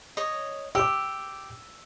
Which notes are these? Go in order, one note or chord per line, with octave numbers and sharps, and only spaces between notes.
C#5 D#5
G4 D6 E6